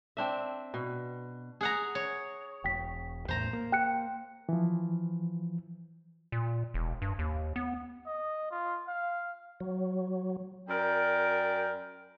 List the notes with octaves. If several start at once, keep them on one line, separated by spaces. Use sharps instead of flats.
C4 D4 E5
B2
G#4 F#5 A#5
C#5
E1 G5 B6
E2 A2 C5 A#5
A#3
G5 F#6 C#7
E3 F3
A#2
E1
G2
D#2
B3
D#5
F4
F5
F#3
F#2 A#4 D5 G5